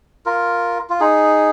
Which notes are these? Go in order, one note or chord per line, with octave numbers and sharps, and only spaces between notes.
F4 A#4
F4
D#4 G#4